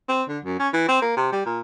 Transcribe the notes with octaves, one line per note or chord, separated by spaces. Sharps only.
C4
D3
F#2
C#4
E3
C4
A#3
C3
G3
A#2